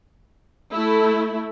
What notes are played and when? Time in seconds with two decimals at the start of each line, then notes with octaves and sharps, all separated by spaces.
0.72 A3 E4